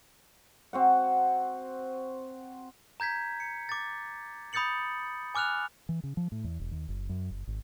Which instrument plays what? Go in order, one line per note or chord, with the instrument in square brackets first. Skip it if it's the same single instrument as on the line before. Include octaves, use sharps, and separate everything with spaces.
[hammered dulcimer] C4 F#4 F#5
[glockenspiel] A#5 G6 G#6 B6
C#7
D6 A6
B5 D#6 G6 A6 C#7 F#7
G#5 D6 F6 F#6 F7
[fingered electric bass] E3
C#3
F3
A2
E2
E1
D#2
F#1
F#2
F#1
G#1